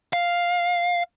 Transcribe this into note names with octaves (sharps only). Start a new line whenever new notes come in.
F5